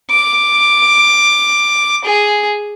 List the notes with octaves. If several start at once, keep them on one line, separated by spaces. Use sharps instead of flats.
D6
G#4